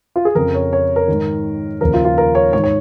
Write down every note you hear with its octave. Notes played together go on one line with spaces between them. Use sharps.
F4
G#4
F2 C#3 F3 A#4
C#5
C#5
A#4
G#2 D#3
D#2 C#3 F3 A#4
F4
F4
A#4
C#5
G#2 D#3 C#5
C#5